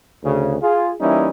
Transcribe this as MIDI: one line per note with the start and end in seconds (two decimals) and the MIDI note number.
0.24 0.56 38
0.24 0.56 49
0.62 0.93 65
0.62 0.93 68
1.01 1.30 52
1.01 1.30 55
1.01 1.30 58
1.01 1.30 61
1.01 1.30 63
1.01 1.30 64